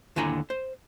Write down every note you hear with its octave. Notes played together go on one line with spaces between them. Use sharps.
D#2 D3 E4 G#5 A#5
C5